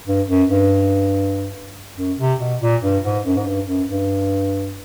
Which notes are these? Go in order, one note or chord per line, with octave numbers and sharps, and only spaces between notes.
G2
F#2
G2
F#2
C3
B2
A#2
G2
G#2
F#2
G#2
G2
F#2
G2